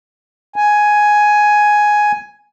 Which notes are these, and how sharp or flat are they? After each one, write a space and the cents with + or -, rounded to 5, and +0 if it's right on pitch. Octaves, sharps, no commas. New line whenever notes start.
G#5 +5